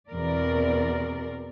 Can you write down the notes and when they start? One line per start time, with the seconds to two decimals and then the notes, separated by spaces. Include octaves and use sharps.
0.12 E2 B2 C4 A#4 D5